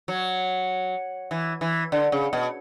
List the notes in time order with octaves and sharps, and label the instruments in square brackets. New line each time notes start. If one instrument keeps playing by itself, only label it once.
[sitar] F#3
E3
E3
D3
C#3
B2